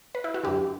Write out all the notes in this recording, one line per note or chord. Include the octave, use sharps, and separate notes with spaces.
B4
E4
F#4
F#2 D3 G4